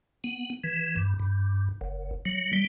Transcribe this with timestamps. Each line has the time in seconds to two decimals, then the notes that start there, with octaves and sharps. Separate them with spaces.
0.24 B3
0.64 E3
0.96 G2
1.20 G2
1.81 F#1
2.25 F#3
2.53 G3